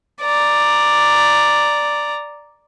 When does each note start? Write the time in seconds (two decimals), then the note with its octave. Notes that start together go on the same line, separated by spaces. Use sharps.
0.22 D5 A#5